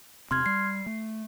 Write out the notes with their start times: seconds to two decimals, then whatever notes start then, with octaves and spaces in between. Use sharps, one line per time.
0.31 E1 C3 C4 C6 F6 G#6
0.46 G3 C7
0.86 A3